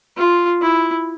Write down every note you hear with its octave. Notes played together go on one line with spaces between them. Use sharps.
F4
E4